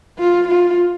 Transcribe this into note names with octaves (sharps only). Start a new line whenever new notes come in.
F4
F4